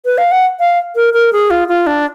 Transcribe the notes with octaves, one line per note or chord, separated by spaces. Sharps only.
B4
F5
F#5
F5
A#4
A#4
G#4
F4
F4
D4